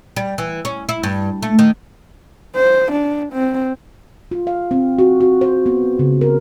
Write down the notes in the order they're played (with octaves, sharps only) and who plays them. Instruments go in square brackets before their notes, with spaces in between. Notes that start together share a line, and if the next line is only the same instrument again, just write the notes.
[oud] G3
E3
C#4
E4
G2
A3
D#3
[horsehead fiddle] C5
D4
C4
[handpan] F4
F5
C4
F#4
F#4
C5
B3
C#3
A#4